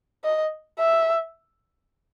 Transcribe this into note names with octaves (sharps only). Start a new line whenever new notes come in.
D#5
E5